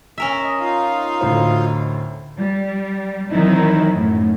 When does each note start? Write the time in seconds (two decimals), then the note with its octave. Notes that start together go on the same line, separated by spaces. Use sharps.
0.18 C#4 A#4 E5
0.43 D#5
0.60 D#4 F4 F5
1.21 D2 A2 C5
2.38 G3
3.31 D#3 E3 F#3 C4 D#4 E4
3.90 F#2 A2 F#3